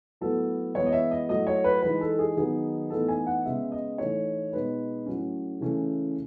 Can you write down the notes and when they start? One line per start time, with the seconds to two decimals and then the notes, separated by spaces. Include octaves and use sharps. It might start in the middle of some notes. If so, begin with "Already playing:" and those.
0.21 A2 F#3 B3 A4
0.75 E3 G#3 B3 C#5
0.86 D#5
0.92 E5
1.11 D#5
1.29 A2 F#3 A3 D#5
1.47 C#5
1.64 B4
1.82 E3 G#3 D#4 B4
2.01 A4
2.19 G#4
2.37 D#3 F#3 B3 D#4 G#4
2.90 A2 E3 B3 D#4 A4
3.08 G#5
3.26 F#5
3.45 C#3 G#3 B3 E5
3.72 D#5
3.98 A2 E3 A3 D#4 C#5
4.52 B2 G#3 D#4 B4
5.06 A2 F#3 C#4
5.61 C#3 E3 A3 C#4